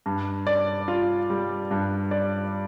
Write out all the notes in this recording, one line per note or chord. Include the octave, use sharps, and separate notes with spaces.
G2
D5
F4
G3
G2
D5